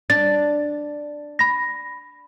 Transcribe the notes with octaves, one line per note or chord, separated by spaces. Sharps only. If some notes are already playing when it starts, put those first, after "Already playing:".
D4 A6
B5 A#6